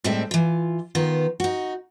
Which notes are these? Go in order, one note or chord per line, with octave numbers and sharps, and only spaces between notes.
A2 G3 G#3 C4 C5 E5
E3 F4
D#3 B3 F4
D#4 F#4